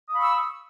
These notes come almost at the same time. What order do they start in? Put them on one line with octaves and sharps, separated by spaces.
D#6 F5 B5 C#6 E6